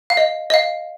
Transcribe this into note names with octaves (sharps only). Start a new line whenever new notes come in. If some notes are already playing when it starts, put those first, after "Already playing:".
F5
D#5
D#5
F5